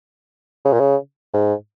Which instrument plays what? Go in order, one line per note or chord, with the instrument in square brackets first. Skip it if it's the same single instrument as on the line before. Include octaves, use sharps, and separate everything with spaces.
[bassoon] C#3
A#2
C#3
G#2